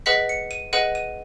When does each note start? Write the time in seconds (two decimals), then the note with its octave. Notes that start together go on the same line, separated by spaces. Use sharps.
0.06 G#4 B4 D#5 F#5 B6
0.29 C#7
0.51 D#7
0.73 G#4 B4 D#5 F#5 D#7
0.95 D#7